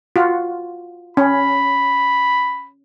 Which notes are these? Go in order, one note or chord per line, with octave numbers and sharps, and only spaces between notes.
F4 F#4
C#4 B5